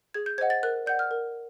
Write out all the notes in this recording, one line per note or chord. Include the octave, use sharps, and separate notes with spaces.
G#4 G#6
G6
C5 D#5 F#5 G#6
A6
A#4 F#6
D5 F#5 G6
F6
A#4